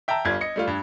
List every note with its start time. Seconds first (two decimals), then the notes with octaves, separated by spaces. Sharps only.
0.08 E5 G5 A5 A#5 E6
0.25 G1 G3 F4 G#6
0.41 D#5 C#7
0.56 G3 A3 F4
0.67 G2